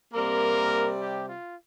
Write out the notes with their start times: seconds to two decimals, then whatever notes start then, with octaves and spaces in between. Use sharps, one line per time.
0.14 C3 G3 A#3 C4 A#4
1.00 G4
1.28 F4